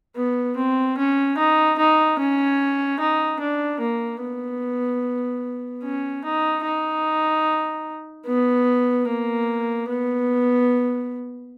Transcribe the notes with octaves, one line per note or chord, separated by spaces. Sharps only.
B3
C4
C#4
D#4
D#4
C#4
D#4
D4
A#3
B3
C#4
D#4
D#4
B3
A#3
B3